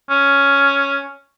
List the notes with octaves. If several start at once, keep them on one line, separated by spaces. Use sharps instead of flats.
C#4